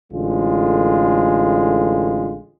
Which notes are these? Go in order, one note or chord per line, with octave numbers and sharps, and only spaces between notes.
A1 D3 G#3 F4